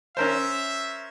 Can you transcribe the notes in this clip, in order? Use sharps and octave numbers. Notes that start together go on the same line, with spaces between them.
C#4 A#4 C5 E5